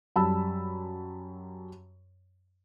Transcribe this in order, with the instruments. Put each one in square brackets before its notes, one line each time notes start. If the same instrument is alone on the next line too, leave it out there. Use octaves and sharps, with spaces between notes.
[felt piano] F#2 G3 A5 B5 E6